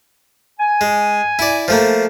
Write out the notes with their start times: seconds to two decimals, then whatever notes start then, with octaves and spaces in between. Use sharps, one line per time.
0.60 G#5
0.81 G#3
1.39 E4 D5
1.68 F3 A3 A#3